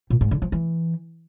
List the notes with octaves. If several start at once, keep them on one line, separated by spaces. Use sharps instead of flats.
A#2
G#2
D3
F3
E3